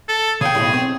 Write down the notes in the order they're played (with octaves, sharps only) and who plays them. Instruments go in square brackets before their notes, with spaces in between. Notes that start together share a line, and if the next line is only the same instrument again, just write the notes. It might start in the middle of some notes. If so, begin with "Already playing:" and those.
[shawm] A4
[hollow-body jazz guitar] C#3 G5 [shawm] G#4
[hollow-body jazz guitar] B1 F#2 A2
C4